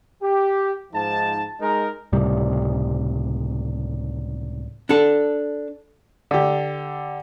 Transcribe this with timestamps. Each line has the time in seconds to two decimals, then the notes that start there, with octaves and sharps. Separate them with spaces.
0.22 G4
0.94 G#2 F3 D#4 A5
1.61 G#3 D#4 A#4
2.12 C#2 A2 C3 G3
4.89 D4 A4
6.31 D3 G4